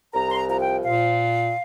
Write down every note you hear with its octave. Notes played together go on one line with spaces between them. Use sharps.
C2 A#5
C6
A#5
F3 A#5
G5
A#2 F5